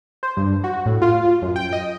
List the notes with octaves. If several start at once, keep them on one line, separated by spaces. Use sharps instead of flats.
C5
G2
F#4
A2
F4
F#2
G5
D#5